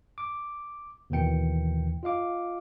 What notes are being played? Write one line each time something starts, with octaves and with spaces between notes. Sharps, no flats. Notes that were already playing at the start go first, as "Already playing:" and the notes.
D6
D#2 B2 D#3 E3 G5 C#7
F4 D#5 F5 D6